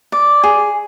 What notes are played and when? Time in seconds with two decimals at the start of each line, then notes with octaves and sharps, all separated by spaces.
0.12 D5
0.43 G#4